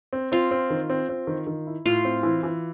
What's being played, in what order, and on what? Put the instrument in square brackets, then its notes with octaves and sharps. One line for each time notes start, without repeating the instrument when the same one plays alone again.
[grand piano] C4
[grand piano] C4 [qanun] F4
[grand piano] C4
D#3
C4
C4
D#3
D#3
E4
[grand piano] A2 [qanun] F4
[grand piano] C4
E3
E3